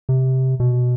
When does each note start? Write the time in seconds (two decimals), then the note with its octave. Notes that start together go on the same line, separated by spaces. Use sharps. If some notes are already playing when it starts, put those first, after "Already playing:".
0.09 C3
0.60 B2